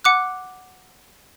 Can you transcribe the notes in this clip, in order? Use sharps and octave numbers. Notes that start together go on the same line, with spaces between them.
F#5 D6 F#6